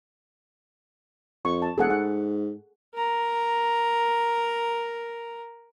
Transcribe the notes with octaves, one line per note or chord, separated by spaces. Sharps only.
F2 C#6
A5
E1 G#4 A4 F#5
G#2 F#5
A#4 A#5